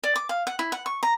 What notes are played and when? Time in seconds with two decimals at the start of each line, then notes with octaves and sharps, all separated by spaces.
0.04 D5
0.16 D6
0.29 F5
0.47 F#5
0.59 E4
0.72 F#5
0.86 C#6
1.03 A#5